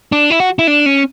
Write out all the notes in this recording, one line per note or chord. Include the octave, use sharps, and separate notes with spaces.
D4
E4
F#4
E4
D4
C#4